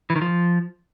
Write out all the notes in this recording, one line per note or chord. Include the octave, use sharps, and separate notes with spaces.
E3
D#3
F3